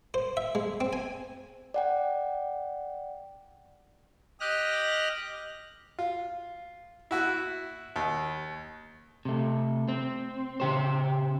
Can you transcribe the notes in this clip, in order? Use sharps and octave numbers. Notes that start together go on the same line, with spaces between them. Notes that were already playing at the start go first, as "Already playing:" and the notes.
C5
E5
G#3
C4
G#5
D5 F#5 G5
G4 D#5 F6 F#6 A#6
F4
E4 F#4 E5
D#2
C3 A3
C4
C#3 G4 C5